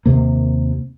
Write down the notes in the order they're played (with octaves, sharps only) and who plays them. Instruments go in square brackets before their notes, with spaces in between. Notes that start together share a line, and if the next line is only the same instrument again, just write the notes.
[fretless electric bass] D#2 C3 A#3